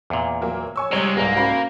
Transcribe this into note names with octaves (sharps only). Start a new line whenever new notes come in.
E2 A#2
F#3 A#3 A#4
C#5 G#5 C#6 E6
C3 G3 G#3 C#5 A#5 G#6
C2 G#2 A#3 G#4 B4
C#4 F#4 C5 B5